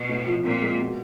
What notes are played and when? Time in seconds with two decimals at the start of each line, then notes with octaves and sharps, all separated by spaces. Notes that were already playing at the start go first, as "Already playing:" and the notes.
Already playing: B2
0.09 A2
0.26 F3
0.44 A#2 C4
0.62 G#3
0.80 B2